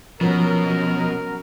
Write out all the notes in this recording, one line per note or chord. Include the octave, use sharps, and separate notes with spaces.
B2 F3 F#3 C#4 A#4